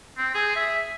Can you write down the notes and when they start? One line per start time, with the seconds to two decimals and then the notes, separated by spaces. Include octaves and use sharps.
0.17 C4
0.35 G#4
0.56 E5